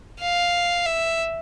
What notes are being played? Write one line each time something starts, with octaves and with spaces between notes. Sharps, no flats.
F5
E5